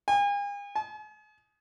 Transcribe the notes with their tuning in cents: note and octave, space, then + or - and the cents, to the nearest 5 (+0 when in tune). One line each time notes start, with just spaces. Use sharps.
G#5 -45
G#5 +40